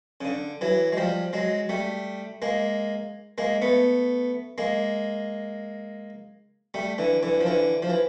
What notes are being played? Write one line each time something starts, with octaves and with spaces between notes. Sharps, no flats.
C#3
D3
E3 F#3
G#3
F3 G3
F#3 G#3
G3 A3
G#3 A#3
G#3 A#3
A3 B3
G#3 A#3
G3 A3
D3 E3
D3 E3
F3
D3 E3
F3
E3